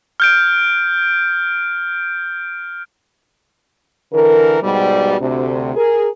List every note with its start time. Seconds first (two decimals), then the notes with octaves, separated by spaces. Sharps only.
0.20 F6 G6 D7
4.13 D3 E3 A#4
4.62 G#2 B2 G3
5.20 D2 C3
5.76 G#4 A#4